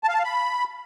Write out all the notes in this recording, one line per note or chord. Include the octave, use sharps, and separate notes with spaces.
A5
F5
A5
F5
B5